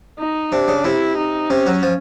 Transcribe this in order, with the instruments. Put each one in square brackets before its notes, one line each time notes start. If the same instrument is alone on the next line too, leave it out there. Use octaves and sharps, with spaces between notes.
[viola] D#4
[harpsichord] C3 [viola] D4
[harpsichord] C#3
[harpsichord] C3 [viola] E4
[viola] D#4
[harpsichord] C3 [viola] C#4
[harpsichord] F#3
F3